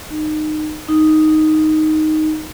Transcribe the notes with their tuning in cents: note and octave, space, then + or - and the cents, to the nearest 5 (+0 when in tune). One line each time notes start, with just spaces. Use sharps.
D#4 -20
D#4 +0